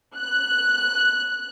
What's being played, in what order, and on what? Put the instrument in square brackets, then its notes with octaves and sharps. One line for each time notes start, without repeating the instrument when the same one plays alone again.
[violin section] F#6